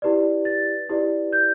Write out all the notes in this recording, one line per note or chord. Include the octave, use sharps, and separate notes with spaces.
E4 G4 B4 D5
A6
E4 G4 B4 D5
G6